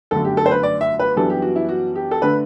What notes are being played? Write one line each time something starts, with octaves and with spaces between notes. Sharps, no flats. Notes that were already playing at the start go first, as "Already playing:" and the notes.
G1 F#2 D3 A3 A4
G4
A4
C5
B4
D5
E5
B4
F#2 E3 G3 B3 D4 A4
G4
F#4
E4
F#4
G4
A4
D3 A3 D4 B4